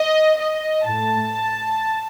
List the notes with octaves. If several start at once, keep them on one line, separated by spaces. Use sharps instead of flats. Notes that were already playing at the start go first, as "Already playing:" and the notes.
Already playing: D#5
D#5
A2 A3 A5